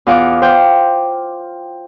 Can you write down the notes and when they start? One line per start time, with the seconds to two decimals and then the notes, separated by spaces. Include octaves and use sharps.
0.07 E2 F4 F5 F#5 D6
0.42 C5 F5 G5